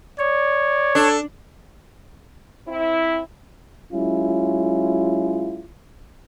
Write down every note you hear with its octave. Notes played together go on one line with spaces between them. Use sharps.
C#5 D5
D4 A4
C4 E4
F#3 G#3 C#4 E4 F4